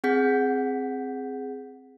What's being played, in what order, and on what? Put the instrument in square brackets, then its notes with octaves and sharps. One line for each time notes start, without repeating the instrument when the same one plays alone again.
[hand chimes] C4 G#4 F#5 G6 B6